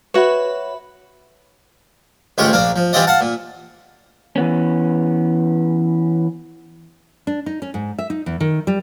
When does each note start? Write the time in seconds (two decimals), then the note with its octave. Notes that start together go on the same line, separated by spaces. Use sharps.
0.14 F#4 B4 C#5 E5 B5
2.38 A1 D2 G#3 F4 G4 C#6
2.53 A#1 A#3 D4 F5
2.76 F3
2.93 E3 G3 C4 F4 D5 D#5
3.07 F5 F#5 A5
3.21 A#2
4.36 E3 B3 C#4
7.27 D4
7.46 D#4
7.62 C#4
7.74 G#2
7.99 E5
8.10 D#4
8.26 E2
8.40 D#3
8.67 G3